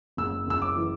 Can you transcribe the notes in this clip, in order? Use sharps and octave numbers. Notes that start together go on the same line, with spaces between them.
F#1 E6
F#1 E6
D6
E3